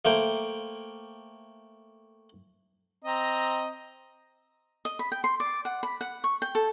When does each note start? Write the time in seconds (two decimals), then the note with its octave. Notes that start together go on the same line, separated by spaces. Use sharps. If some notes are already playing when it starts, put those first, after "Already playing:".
0.05 A3 A#3 C5 G5
3.04 C4 D#5 A#5
4.85 D#5
4.99 B5
5.12 G5
5.24 C6
5.40 D5
5.65 F#5
5.83 B5
6.01 F#5
6.24 C#6
6.42 G5
6.55 A4